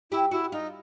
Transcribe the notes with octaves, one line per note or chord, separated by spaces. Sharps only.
E4 G4
E4 F#4
D#4 F4